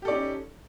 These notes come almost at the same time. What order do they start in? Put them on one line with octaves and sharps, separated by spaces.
G4 A4 D5 D#4 C#4